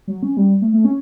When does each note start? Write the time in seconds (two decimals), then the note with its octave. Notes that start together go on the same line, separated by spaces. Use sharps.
0.08 F#3
0.23 C#4
0.37 G3
0.62 A3
0.73 A3
0.85 C#4